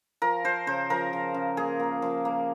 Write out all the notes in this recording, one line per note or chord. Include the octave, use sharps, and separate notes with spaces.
F3 A#4
F3 C5
C#3 C5
F3 A#4
F3
C#3
A#3 G#4
A#3
F3
A#3